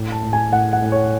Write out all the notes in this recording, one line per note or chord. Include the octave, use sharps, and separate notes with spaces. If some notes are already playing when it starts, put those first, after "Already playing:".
Already playing: A2
A5
A2
G#5
A2 F#5
F#5
A2
C#5